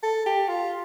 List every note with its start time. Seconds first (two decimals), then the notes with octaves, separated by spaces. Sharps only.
0.03 A4
0.26 G4
0.48 F4